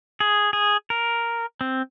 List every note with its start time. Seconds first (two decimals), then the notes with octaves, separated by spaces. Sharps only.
0.20 G#4
0.53 G#4
0.90 A#4
1.61 C4